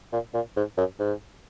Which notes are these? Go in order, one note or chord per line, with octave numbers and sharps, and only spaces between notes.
A#2
A#2
G#2
F#2
G#2